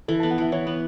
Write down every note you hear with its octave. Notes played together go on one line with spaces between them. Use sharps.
E3 A4
B3 A5
F#5
E3 E5
E3 C#5
B3